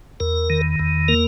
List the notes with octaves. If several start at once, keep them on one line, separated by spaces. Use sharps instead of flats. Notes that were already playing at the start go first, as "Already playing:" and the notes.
E2 A#4
D#3
E2
A#3 A#4